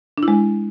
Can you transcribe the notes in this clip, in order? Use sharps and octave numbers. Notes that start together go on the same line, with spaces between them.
D4
E4
G#3